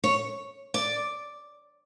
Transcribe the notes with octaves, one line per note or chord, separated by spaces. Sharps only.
C#5
D5